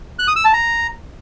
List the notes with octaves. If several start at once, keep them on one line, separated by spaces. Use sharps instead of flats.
F#6
D#6
E6
A5
A#5